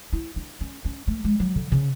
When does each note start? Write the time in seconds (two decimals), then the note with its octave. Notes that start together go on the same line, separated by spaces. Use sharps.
0.13 E4
0.36 D4
0.61 C#4
0.85 C#4
1.08 A3
1.24 G#3
1.40 F#3
1.56 D3
1.72 C#3